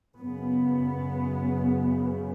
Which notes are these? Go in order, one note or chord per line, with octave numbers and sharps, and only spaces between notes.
F#2 C#3 B3